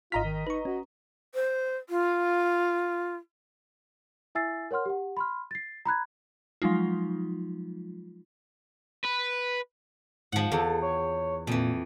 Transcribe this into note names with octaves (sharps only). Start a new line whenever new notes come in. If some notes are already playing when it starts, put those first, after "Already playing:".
G#1 F4 D#5 A#5 F6 B6
D#3
D#4 B4 C#6
C#4 F#4
C5
F4
E4 E5 G#5 E6 A6 C7
A#4 C#5 F#5 C6 F6
G4 F#5
B5 C6 F6
A6 C7
A#5 B5 F#6 G#6
F3 F#3 G#3 D#4 F4
B4
G#2 F3 F#5
E2 A4
C#5
F2 A#2 E3